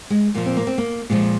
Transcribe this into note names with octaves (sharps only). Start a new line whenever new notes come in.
G#3
A#2 F3 A#3
C4
A#3
C4
A#3
A#2 F3 G#3